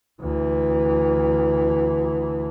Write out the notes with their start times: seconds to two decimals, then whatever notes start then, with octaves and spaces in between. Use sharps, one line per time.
0.21 D2 E3